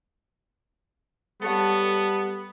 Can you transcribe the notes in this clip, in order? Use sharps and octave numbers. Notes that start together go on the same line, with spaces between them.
G3 B3 A4 C#5 F#5